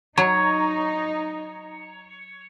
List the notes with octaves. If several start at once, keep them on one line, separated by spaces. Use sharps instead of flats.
F#3 D#4 C#5 A#5